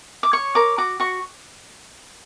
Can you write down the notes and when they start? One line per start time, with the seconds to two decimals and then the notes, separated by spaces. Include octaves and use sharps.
0.23 D6
0.33 C#5 C#6
0.55 A#4 D6
0.78 F#4 D6
1.00 F#4 C#6